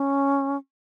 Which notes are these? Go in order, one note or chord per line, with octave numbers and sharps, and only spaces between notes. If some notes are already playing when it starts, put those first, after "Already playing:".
Already playing: C#4